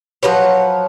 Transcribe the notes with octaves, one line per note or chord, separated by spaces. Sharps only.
F3 F#3 B4 C#5